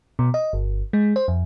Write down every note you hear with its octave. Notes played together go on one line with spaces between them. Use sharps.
B2
D#5
G1
G#3
C5
F2